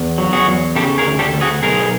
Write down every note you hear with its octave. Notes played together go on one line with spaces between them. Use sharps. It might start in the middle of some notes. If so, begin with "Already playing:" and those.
Already playing: E2
F#3
F#4 G#4
E2
C#3 G4 A4
G#4 A#4
D2
G4 A4
D2
F#4 G#4
B1 G#4 A#4